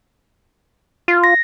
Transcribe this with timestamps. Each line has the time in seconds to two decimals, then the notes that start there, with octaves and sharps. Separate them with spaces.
1.08 F4
1.24 A#6